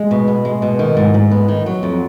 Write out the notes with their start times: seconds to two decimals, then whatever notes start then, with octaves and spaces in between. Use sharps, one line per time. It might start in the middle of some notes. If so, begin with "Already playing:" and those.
Already playing: G#3
0.11 B2
0.28 B3
0.45 G#3
0.62 B2
0.79 D#3
0.97 G#2
1.14 G#2
1.31 B3
1.48 D#3
1.66 F#3
1.83 F2